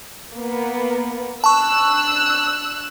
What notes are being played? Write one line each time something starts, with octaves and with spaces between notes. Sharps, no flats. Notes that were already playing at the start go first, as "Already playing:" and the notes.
A#3 B3
D4 A5 C#6 E6 F#6